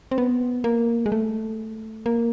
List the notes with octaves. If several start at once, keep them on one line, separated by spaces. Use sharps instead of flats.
C4
B3
A#3
G#3
A3
A#3